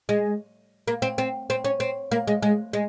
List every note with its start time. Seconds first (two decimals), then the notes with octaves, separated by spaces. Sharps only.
0.09 G#3
0.88 A#3
1.02 C4
1.18 C4
1.50 C4
1.64 C#4
1.80 C4
2.11 A#3
2.27 G#3
2.42 G#3
2.73 G#3